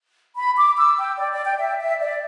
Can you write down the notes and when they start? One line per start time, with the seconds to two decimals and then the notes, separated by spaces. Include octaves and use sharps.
0.36 B5
0.56 D6
0.77 E6
0.97 G5
1.18 D5
1.32 D5
1.45 G5
1.59 E5
1.80 E5
2.00 D5